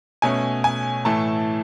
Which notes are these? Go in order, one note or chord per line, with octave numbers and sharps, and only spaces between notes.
B2 A3 C#4 G#5
G#5
A2 E3 A3 A5